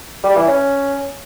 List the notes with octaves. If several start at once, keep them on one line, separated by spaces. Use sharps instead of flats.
G3
E3
C#4